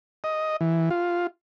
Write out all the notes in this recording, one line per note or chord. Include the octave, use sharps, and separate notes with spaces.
D#5
E3
F4